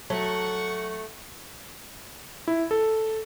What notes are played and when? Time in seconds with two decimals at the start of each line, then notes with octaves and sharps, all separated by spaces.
0.10 F#3 A3 F#5 C#6
2.48 E4
2.71 A4